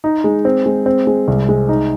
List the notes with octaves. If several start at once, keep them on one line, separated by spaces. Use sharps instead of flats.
D#4
G#3
C4
G#3
C4
G#3
C2
G#3
D#4